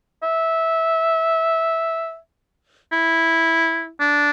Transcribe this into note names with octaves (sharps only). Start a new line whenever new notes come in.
E5
E4
D4